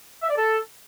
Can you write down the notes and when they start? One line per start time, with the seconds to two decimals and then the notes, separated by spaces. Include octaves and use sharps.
0.22 E5
0.29 D5
0.37 A4